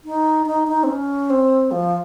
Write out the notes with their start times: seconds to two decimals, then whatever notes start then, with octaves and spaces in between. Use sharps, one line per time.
0.04 D#4
0.46 D#4
0.68 D#4
0.83 C4
0.88 C#4
1.30 C4
1.71 F3